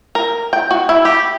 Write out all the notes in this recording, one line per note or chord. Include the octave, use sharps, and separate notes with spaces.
A#4
G5
F#4
E4
G4